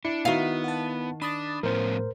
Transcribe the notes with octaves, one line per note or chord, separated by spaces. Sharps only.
D4 E4 C#7
D#3 B3 F#4 E5 F5
F#5 A5
D4 B5 D#6 A6
A2 F3 B3 C#4 A#4 C5